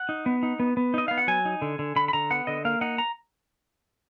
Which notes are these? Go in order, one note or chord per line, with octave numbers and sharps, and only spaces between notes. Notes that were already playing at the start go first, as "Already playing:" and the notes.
Already playing: F#5
D#4
B3
D#4
B3
B3
D#4 D#5
B3 F5
F#5
F#3 G#5
D#4
D3
D3
D3 B5
B5
D3 A#5
B3 F#5
D3 D#5
A#3 F5
D#4 F#5
A#5